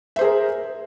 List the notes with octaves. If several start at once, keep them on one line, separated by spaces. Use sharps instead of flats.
G#4 A#4 C5 E5